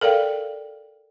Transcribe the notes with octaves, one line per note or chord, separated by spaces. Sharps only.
A4 A#4 D5 F5 G5